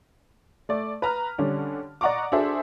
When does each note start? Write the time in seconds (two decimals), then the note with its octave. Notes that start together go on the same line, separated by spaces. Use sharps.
0.69 A3 D5
1.02 B4 A#5 F6
1.38 D3 G3 C#4 D4
2.01 D5 D#5 F#5 A#5 C#6 D6
2.32 D4 F#4 G#4 A4 C5 E5